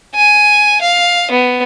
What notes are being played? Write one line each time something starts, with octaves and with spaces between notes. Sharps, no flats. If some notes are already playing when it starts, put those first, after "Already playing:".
G#5
F5
B3